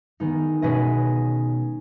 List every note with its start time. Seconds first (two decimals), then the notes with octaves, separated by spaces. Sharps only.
0.20 D#3 G#3 B3 D#4
0.62 B2 G#3 C#4 B4 D#5